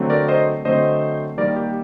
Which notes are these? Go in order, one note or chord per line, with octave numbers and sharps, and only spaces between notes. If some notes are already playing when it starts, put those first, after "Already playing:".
Already playing: D3 F#3 A3 C4
A#4 D5
C5 D#5
D3 F#3 A3 C4 C5 D#5
D#3 G3 A#3 A#4 D5
G4